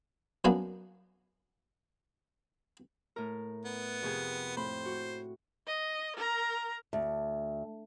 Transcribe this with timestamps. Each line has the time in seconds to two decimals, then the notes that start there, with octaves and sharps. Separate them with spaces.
0.44 F#2 A#3 B3 D4 G#5
3.16 A2 A#4
3.65 B3
4.02 F2 C3 G#4
4.57 A2 C4 C5 B5
4.85 F#4
5.67 D#5
6.16 A#4 A#5
6.93 D2